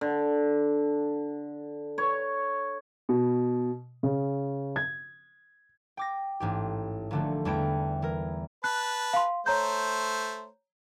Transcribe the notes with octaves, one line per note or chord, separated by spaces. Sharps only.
D3
C#5
B2
C#3
G#6
G5 D6 A#6
A1 G#2 G4
A#1 D3 A3
E2 G3 A3 E4 G5 D7
E3 A#4
B4 A5 F#6
F5 C6
A3 C5 C#5 A#5 G6